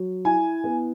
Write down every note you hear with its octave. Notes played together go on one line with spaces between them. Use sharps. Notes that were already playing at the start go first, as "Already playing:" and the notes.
Already playing: F#3
E4 G#5
B3